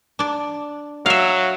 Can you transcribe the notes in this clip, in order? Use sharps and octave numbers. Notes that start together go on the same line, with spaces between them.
D4 D5
F#3 E5 F5